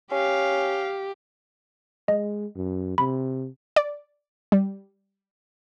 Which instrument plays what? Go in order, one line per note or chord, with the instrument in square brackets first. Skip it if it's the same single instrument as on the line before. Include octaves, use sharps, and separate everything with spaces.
[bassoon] C#4 [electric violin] G4 [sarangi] F5
[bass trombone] G#3 [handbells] D#5
[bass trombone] F#2
[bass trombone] C3 [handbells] B5
[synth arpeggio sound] D5
G3